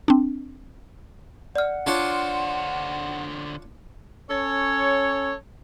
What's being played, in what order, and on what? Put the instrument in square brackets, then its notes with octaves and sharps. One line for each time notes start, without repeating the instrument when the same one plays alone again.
[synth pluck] C4 D4
[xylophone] D5 F6 [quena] F#5
[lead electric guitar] D3 C5 [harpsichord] D4 F4 C#5
[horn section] C#4 A4 C#5